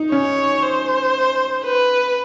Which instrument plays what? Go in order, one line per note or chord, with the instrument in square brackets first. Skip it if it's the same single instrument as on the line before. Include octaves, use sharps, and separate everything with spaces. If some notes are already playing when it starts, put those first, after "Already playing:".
Already playing: [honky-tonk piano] D#4
[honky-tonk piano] C#4 [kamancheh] C#5
[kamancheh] C5
B4